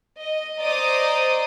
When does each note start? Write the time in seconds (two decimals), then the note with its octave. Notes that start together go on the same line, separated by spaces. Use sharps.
0.19 D#5
0.62 C5 D5 D#5 A#5 D6 D#6